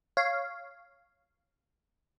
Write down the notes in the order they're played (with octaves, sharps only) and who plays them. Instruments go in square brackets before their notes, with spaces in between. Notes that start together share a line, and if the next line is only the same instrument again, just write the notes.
[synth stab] C#5 F5